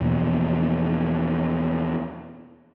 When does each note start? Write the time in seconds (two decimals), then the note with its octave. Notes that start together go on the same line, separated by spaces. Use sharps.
0.01 E2 B2 F3 A#3